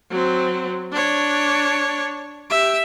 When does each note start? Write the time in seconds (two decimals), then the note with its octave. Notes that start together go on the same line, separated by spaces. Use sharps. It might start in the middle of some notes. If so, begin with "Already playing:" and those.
0.10 F#3 C4
0.92 D4 C#5
2.50 G4 E5